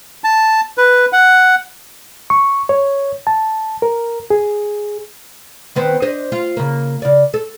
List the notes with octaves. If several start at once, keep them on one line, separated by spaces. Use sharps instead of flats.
A5
B4
F#5
C#6
C#5
A5
A#4
G#4
D#3 B3 C4
D4 C5 D#5
F4
C#3 A#3
C#3 D5
A4